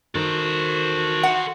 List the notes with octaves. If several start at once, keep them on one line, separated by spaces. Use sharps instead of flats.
D#3 F#4 A4 C5
F#5